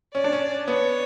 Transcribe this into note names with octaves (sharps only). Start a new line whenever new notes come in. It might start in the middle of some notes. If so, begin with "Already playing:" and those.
C#4 D5
D4
C#4
B3 C#5